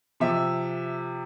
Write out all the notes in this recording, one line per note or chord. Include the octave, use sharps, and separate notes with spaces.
C3 F3 E5